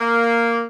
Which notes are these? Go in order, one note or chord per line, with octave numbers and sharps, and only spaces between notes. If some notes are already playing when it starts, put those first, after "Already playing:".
A#3